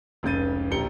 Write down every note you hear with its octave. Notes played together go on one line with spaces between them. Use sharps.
F1 C#2 C#3 G6 A6 D#7
D1 A#1 G4 A#5 C#7 G7